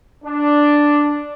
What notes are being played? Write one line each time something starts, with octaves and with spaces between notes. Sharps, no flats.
D4